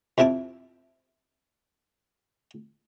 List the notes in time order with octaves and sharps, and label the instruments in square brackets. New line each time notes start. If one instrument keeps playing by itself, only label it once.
[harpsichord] F2 C3 E4 A5 D6